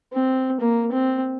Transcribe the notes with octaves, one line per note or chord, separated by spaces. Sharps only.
C4
A#3
C4